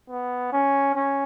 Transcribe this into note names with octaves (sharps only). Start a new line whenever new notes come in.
B3
C#4
C#4